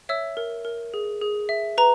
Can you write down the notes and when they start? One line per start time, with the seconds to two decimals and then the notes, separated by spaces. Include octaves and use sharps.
0.09 C#5 E5 E6
0.37 A#4
0.65 A#4
0.94 G#4
1.22 G#4
1.49 E5
1.78 B4 A#5